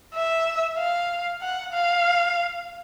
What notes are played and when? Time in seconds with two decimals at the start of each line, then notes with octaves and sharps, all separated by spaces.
0.15 E5
0.79 F5
1.42 F#5
1.73 F5